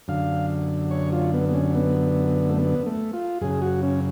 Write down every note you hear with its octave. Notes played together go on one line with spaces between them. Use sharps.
F#2 D3 F5
C#5
F4
B3
B3
C#4
B3
A3
B3
A3
F4
F#2 C#3 G#4
F#4
C#4